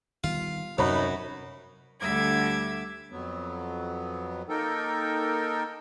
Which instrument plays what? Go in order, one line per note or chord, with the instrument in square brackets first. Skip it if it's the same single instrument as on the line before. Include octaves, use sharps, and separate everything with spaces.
[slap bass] D#3 G3 B3 [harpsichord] F4
[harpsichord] F#2 [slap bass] C3 [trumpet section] D#4 F#4 B4 [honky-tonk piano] C#5 B5
[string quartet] D2 D3 G3 E5 D6 G#6
[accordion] F2 F#3 B3
A#3 D#4 A4 A#4 G5